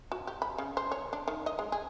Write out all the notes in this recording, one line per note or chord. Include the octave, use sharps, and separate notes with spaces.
F#4
G4
B5
C#3
C5
C#5
D4
D#3
D#5
G#3
G#4